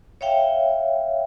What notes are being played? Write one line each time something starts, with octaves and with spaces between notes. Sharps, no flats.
C#5 E5 F5 G5